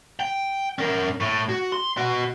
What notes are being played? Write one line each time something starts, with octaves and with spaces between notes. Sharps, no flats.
G5
C#4 A#4
A2
F#4
C6
B3 F#4